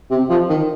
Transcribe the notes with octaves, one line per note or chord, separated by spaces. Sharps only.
C3
F3
D#3